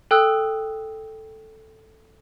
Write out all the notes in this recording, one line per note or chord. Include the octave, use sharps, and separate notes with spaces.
A4 G5 D#6 E6 F#6